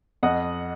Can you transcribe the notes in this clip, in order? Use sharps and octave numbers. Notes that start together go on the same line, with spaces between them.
F2 D#5 F#5